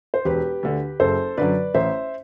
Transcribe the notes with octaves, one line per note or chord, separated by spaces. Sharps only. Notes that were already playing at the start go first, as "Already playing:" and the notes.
C5
E1 G4 B4
D2 D3
F#1 A4 C5
F#2 D3 B4 D5
A1 C5 E5